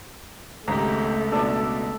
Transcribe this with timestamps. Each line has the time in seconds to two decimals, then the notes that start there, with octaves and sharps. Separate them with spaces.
0.68 G#1 C#2 A3 G4 A#5
1.32 B2 D4 A4 D5